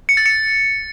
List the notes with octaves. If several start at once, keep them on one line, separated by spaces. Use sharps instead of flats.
C#7
A6
C#7